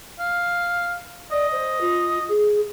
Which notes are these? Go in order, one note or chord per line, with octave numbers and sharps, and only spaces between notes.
F5
D5 D#5
C5
F4
G#4